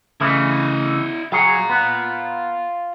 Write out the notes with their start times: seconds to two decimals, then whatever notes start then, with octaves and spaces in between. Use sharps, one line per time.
0.21 C#3 E3 A3 E4 D#5
1.32 F#3 F4 G#4 C#5 A#5
1.70 B3